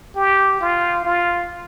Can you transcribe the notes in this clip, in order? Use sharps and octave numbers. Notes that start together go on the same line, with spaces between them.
G4
F4
F4